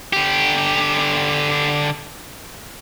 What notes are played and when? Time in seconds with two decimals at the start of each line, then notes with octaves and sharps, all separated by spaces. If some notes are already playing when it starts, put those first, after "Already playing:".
0.13 D3 G4